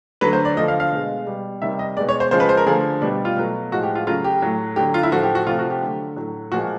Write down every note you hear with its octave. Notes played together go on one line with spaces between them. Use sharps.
D3 F#3 A3 B4
C5
D5
D3 F3 A3 D#5
F5
F5
B2 G#3
B2 G3
C3 D#3 G3 E5
D#5
B2 G#3 D5
C#5
C5
C#3 F3 G#3 C5
B4
C5
A#4
D3 F3 A3 G#4
B2 G3 D4
F4
B2 F#3 A3
A2 F3 G#3 F#4
G4
F4
C#3 F#3 A3 F4
G4
A2 F#3 A3
D3 F#3 A3 G4
F4
E4
A2 F3 A3 F#4
G4
F#4
C3 F3 A3 F4
F#4
G4
D3 F#3 A3
A2 F#3 A3
A#2 F3 G#3 F#4